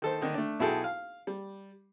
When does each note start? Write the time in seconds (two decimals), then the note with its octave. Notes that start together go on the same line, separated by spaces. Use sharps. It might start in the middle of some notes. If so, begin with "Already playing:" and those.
0.02 D#3 A4 C5
0.21 D3 D#3 D#4
0.34 A3 D4
0.60 B1 E4 F#4 G#4 A4 G5
0.84 F5
1.27 G3